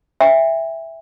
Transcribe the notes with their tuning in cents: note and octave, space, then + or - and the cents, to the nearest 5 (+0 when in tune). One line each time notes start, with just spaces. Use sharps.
E5 +0 G5 +45